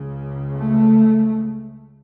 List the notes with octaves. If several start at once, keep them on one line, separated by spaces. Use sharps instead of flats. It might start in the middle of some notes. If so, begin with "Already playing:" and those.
Already playing: C#2 C#3
A3